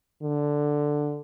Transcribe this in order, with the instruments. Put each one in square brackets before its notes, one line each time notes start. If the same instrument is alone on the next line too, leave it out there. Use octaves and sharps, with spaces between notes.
[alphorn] D3